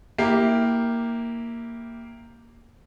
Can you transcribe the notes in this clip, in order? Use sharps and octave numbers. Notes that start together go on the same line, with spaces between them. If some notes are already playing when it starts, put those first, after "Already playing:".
A#3 E4 G4